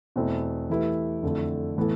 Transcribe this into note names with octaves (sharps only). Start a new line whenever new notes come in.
E2 B2 A3 C4 E4
E3 A3 E4 G4 B4
F2 D3 A3 E4 A4
A2 E3 B3 E4 A4